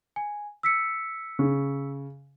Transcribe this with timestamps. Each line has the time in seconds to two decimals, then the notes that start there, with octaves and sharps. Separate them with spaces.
0.16 G#5
0.63 E6 B6 C#7
1.39 C#3